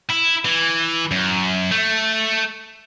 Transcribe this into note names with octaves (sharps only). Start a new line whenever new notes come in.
E4
E3
F#2
A3